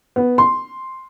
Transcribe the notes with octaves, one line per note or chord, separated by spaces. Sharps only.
B3
C6